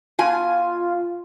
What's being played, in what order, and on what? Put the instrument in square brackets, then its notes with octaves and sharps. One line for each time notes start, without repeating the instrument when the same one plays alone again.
[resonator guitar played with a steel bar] B2 G#5 [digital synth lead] F4